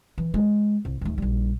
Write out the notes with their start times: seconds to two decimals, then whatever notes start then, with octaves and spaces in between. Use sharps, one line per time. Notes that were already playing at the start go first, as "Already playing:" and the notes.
0.18 E3
0.34 G#3
0.85 C2
1.01 D#2 A3
1.18 A#1 G3